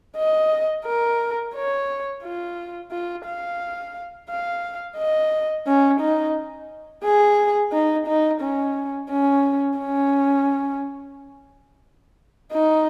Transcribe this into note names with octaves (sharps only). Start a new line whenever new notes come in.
D#5
A#4
C#5
F4
F4
F5
F5
D#5
C#4
D#4
G#4
D#4
D#4
C#4
C#4
C#4
D#4